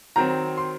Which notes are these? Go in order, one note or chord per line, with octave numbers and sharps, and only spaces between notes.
D#3 F#3 C4 A#5
C6